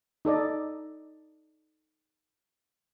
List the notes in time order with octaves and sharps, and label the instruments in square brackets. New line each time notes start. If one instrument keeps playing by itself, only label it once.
[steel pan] D#4 A4 D5 D#5